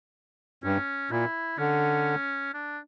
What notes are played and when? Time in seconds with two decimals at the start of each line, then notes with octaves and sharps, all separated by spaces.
0.64 G2 C#4
1.11 A#2 E4
1.58 D3 C#4
2.54 D4